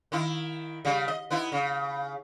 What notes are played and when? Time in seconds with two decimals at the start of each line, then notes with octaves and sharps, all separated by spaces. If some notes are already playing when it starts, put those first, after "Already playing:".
0.12 D#3 E4
0.85 C#3 G3
1.08 D#5
1.30 B3 D#4 E4
1.52 C#3